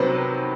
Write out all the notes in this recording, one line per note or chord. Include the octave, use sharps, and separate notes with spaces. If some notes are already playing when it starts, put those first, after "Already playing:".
Already playing: C3 D#3 F#3 B3 B4 C5